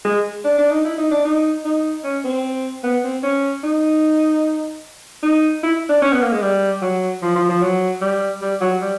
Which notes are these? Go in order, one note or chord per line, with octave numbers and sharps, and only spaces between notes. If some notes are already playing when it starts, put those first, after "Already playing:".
G#3
D4
D4
D#4
E4
D#4
D4
D#4
D#4
C#4
C4
B3
C4
C#4
D#4
D#4
E4
D4
C#4
B3
A#3
G#3
G3
F#3
F3
F3
F3
F#3
G3
G3
F#3
G3